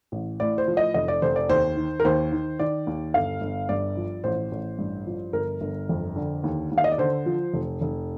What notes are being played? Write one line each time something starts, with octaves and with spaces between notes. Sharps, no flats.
A1
A2 D5
C5
F3
D#5
F1 D#5
D5
F1 C5
D5
D#2 C5
D#3
A#4
D#2 C5
D#3
D#3 D5
D#2
G1 F5
G1
G2 D5
F3
A1 C5
A1
G2
F3
G1 A#4
G1
F2
D3
D#2
D#2
F5
D#5
D5
D3 C5
F3
F1
F1